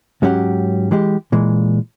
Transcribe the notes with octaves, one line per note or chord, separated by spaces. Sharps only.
G#2 F#3 C#4 G4 F#5
E3 G#3 G4
A#2 E3 G#3